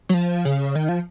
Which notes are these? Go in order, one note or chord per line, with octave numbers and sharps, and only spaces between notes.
F#3
F3
C#3
D#3
F3